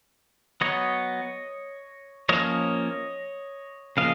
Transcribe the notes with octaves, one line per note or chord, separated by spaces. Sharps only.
F#3 B3 C#5 D#5
F3 A#3 C#4 C#5 D#5
C#3 F3 A#3 D#5 F5